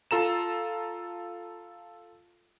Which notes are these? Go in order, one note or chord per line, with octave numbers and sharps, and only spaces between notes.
F4 A4 A#5 E7